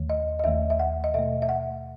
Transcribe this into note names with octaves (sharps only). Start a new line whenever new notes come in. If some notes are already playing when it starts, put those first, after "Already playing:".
Already playing: D#2 D#3 A3
D#5
D#5
D#2 D#3 A3 E5
E5
F#5
D#5
B2 A3 E5
E5
F#5